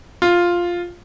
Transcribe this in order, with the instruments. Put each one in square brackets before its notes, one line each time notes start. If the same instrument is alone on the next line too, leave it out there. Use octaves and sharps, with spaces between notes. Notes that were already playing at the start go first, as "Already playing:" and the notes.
[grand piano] F4